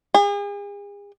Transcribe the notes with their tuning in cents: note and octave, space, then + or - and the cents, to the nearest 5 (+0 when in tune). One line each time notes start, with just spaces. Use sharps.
G#4 -40